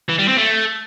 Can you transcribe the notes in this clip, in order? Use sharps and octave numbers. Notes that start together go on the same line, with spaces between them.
E3
G3
C4
A3